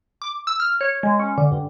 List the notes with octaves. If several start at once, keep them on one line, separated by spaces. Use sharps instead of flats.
D6
E6
F6
C#5
G#3
C#4
D3
G2